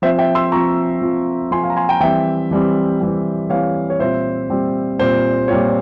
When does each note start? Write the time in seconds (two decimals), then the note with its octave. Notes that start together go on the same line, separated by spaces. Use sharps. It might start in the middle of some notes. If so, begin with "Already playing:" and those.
0.02 F3 C4 F4 C5 E5
0.19 E5 G5
0.35 C6 E6
0.52 F3 C4 F4 A#5 C#6
1.01 F3 C4 F4
1.51 F3 C4 F4 G#5 C6
1.64 F5 G#5
1.70 A#5
1.76 G#5 C6
1.89 G5 A#5
2.00 E3 G3 C4 E5 G5
2.51 E3 G3 C4
3.00 E3 G3 C4
3.50 E3 G3 C4 C#5 F5
3.90 C#5
4.00 A#2 G3 C4 F4 C5 E5
4.49 A#2 G3 C4 F4
4.99 A#2 G3 C4 F4 C5
5.48 A#2 G3 C4 F4 C#5